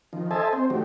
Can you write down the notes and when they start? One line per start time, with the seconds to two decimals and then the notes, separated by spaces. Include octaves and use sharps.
0.13 D#3 F3
0.31 A4 C5 D#5 E5 G#5 A5
0.53 C4 C5
0.70 D#3 F#3 A3 G4